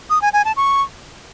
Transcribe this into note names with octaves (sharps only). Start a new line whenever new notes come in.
D#6
G#5
G#5
A5
C#6